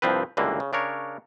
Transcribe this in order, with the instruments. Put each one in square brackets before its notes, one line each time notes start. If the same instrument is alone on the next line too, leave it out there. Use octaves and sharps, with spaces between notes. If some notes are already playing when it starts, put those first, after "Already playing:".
[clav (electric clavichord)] C2 G2 F3 C4 B4
C#2 G2 D3 E3 A#3
C#3
C#3 D4 A#4 C#5